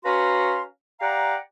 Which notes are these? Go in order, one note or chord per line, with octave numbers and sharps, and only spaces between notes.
C#4 F#4 B4 F5 A#5 C6
G4 D5 F5 F#5 A#5